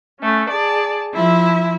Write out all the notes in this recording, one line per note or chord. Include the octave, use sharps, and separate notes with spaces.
A3 C#4
G#4 D5 A5
F3 E4 E5